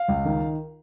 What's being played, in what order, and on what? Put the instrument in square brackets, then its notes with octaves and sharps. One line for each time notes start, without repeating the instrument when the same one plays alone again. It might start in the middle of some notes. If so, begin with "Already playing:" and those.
Already playing: [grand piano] F5
C#2
D#3